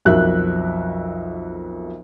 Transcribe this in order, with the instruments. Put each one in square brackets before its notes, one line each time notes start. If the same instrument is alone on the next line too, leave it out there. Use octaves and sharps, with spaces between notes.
[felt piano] B1 F2 F#4 A#4 E5 F#6